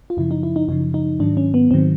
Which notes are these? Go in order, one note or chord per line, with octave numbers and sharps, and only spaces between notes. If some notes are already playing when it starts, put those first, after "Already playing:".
F4
F#2 C#3 F3 E4
D#4
E4
D#4
F#2 C#3 F3 D#4
D#4
G#2 D#3 F#3 D4
C#4
B3
G#2 D#3 F#3 C4